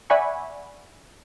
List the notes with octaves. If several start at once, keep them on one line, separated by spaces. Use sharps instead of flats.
D5 E5 F#5 G#5 B5 C#6